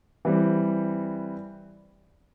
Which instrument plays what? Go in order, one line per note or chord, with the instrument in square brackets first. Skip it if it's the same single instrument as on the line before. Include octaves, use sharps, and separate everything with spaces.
[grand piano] E3 G3 C4